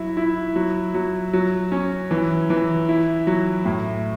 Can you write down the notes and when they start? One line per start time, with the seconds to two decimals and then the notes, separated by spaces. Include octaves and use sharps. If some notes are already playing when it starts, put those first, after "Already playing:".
Already playing: F#3 E4
0.17 E4
0.56 F#3
0.94 F#3
1.33 F#3
1.72 C#4
2.11 E3
2.50 E3
2.89 E4
3.27 F#3
3.65 A2